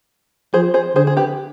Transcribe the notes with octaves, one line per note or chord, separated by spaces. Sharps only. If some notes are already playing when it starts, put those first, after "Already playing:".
F3 G#4 C5
G#4 C5
D3 G#4 C5
G#4
G4 B4